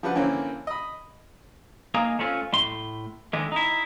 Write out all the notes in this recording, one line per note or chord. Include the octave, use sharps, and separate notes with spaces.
F3 G3 D4 B4 F#5
D3 E3 A#3 C4 C#4
D#5 B5
A#3 D#4 G#4
A3 C4 C#4 F4
A2 A3 C6
D3 D#3 G#3 A3
D#4 E4